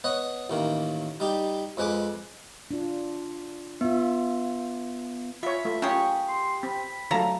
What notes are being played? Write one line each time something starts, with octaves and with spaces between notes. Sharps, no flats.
B3 C#5 D#5 F#5
A1 D#3 A#3
G3 D#4 G4
F2 G#3 B4 G#5 D6
D4 F4
B3 F4 E5
F4 C#5 E5 B5
A3 F4
A#3 C#4 F4 G4 G#4 C#6
C6
C4 B5
D3 F#3 A3 F4 A4 A#5